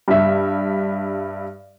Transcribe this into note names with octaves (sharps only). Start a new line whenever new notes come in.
G2 E5